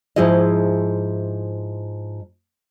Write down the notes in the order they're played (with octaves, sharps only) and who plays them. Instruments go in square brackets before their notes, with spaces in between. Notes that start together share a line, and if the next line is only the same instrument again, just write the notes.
[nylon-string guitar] G#2 F3 E4 G#4 D#5